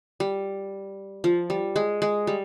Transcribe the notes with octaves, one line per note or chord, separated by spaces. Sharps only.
G3
F3
G3
G#3
G#3
G3